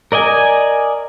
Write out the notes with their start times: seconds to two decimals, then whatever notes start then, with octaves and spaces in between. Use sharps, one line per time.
0.12 A#4 D5 D#5 G#5